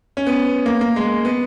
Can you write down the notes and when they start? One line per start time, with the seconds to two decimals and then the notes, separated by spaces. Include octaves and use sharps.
0.17 C#4
0.26 B3
0.66 A#3
0.81 A#3
0.96 G#3
1.25 B3